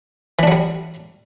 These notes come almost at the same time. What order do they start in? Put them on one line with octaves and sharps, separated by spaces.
E3 D4 F#3 G3